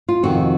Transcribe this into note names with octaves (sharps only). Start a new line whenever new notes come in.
F4
F2 C3 D#3 F#4